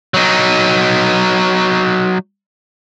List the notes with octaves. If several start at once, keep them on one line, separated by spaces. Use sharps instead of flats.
F#3 D#4